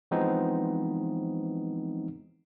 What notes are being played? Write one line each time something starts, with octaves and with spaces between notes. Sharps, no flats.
E3 F3 G#3 B3 C4 D#4